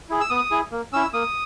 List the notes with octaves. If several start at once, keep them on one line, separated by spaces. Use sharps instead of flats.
E4 G#4
E6
B3 D#6
E4 G#4
A#3
C#4 E4 E6
A#3 D#6